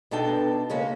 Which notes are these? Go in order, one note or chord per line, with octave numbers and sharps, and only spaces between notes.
B2 D4 D#4 A4 G5
C#3 G#3 A#3 C#4